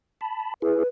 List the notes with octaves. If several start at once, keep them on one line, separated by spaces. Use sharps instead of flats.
A5 B5
E4 G#4 B4